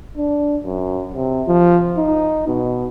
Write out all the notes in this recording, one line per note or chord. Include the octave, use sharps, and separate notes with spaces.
D4
F#2
C3
F3
D#4
B2